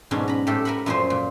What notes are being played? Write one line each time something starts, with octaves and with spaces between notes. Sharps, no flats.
G#2 B2 F#3 C#4 D4
A#5 B5
A2 G4 A4
A#4 B4 E5 F#5 B5
F#2 A#2 F3 C#4 C5
A#2